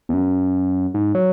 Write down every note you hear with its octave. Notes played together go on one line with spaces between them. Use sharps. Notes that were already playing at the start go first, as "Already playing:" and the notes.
E2
F#2
G#2
F#3